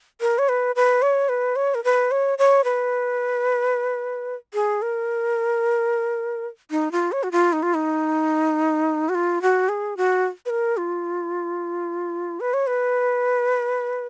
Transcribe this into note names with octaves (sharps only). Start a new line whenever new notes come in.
A#4
C#5
B4
B4
C#5
B4
C#5
A#4
B4
C#5
C#5
B4
G#4
A#4
D#4
F4
C#5
F#4
F4
D#4
F4
D#4
F#4
F4
F#4
G#4
F#4
B4
A#4
F4
B4
C#5
B4